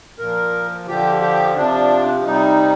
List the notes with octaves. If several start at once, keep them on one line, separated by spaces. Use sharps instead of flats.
A#2 F3 A#4
D3 F3 G4
G4
C3 F3 D4
C3 G3 D#4